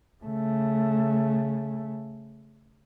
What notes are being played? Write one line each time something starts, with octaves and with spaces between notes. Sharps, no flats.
C#3 A3